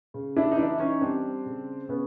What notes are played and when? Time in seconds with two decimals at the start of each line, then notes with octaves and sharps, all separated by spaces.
0.14 C#3
0.36 D4 E4
0.52 D#4
0.57 E3 D4 E4
0.79 C#4 D#4
1.01 G3 C4 D4
1.46 C#3
1.88 C#3 B3 C#4